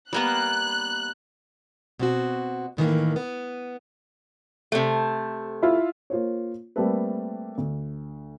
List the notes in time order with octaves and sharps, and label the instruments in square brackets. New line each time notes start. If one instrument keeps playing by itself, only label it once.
[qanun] G3 A#3 B3 [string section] F#6
[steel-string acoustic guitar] B2 C4 F#4
A2 D#3 E3 A#3
B3
[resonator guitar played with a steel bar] C3 A3
[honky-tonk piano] E4 F4
[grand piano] A#3 F4 C5 C#5
G3 A3 A#3 C4 A4 B4
D2